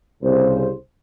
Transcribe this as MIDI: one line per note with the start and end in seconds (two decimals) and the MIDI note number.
0.23 0.71 36
0.23 0.71 49
0.23 0.71 72